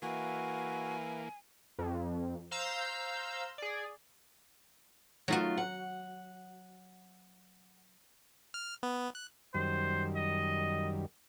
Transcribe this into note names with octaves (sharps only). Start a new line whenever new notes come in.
E3 A#3 F#4 B4 E5 F5 G#5
F2
C5 F5 A#5 E6 G6
G#4 D5
F#3 A3 D#4 F4 F#4
F#5
F6
B3
F#6
F#2 D#3 G3 C5
D#5